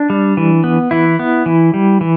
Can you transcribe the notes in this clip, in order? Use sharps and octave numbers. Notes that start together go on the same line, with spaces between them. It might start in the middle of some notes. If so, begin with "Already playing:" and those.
Already playing: D4
G3
E3
B3
E3 E4
B3
E3
G3
E3